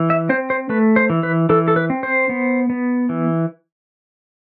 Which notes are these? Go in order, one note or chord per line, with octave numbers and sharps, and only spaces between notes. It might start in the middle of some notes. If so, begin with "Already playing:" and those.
Already playing: E3
E5
C4 C5
C5
A3 B4
C5
E3
B4
E3 A4
A4
B4
C4
C5
B3
B3
E3